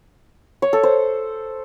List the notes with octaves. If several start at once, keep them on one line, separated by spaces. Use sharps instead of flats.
C#5
A4
C5